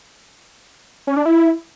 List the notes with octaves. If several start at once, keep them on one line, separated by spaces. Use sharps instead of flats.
C#4
D4
E4